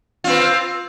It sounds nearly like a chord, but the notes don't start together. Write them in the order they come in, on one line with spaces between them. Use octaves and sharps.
F4 C4 B4